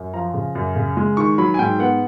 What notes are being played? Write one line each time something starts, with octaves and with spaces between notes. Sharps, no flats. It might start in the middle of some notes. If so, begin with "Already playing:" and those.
Already playing: F#2
F3 A#5
C#3
F#2
C#3
G#3
D#3 C#6
F#3 B5
G#5
G#2 G5
B3 F#5